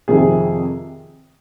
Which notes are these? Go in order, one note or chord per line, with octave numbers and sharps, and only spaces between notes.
F2 C3 D#3 G#4